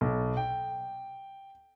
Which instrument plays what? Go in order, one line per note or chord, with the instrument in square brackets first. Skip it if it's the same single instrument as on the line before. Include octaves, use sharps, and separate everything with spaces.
[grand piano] B1
G5